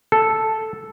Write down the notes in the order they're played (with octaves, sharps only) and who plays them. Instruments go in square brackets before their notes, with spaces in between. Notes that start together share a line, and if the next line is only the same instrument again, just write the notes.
[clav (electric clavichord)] A4